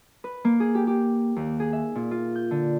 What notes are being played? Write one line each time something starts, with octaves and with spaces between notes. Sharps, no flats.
B4
A#3
G#4
G4
G4
D#2
G#4
E5
A#2
F4
G6
D3